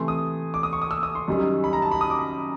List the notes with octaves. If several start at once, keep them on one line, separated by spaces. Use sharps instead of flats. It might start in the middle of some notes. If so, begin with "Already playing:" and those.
Already playing: C3 E3 A3 C6
D#6
D6
D#6
C#6
D#6
E6
D#6
C6
F#2 D#3 G3
B5
A#5
A5
B5
D#6
D6
B5